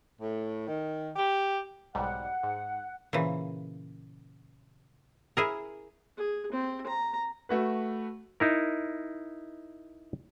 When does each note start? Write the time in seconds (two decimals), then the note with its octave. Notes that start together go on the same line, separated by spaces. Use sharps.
0.20 A2
0.67 D#3
1.16 G4
1.95 B1 G#2 G3 F#5
2.43 G#2
3.13 A#2 C#3 E3
5.37 E4 G#4 A#4
6.17 G#4
6.53 C4
6.87 A#5
7.49 A3 F#4 B4
8.40 D#4 E4 A#4